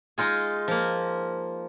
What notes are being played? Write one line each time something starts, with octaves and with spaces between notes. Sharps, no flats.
G#3 D#4 F4 G#4
F3 A#3